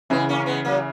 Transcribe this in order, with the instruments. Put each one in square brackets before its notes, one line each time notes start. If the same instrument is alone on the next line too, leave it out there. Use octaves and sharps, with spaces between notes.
[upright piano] C#3 E3 [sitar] G#3 B3
[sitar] A#3 C#4
G#3 B3
F#3 A#3